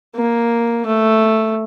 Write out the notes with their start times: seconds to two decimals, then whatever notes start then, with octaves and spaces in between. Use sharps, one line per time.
0.15 A#3
0.86 A3